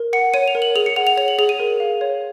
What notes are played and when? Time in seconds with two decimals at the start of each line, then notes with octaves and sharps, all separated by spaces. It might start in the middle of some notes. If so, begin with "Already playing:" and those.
Already playing: A#4
0.13 F#5 C#7
0.34 C#5 D#7
0.48 F7
0.55 A#4
0.62 F#7
0.75 G#4 F7
0.86 C#7
0.96 F#5 F7
1.07 F7
1.17 C#5 F7
1.28 F#7
1.38 G#4 F7
1.49 D#7
1.60 A#4
1.80 F5
2.01 C#5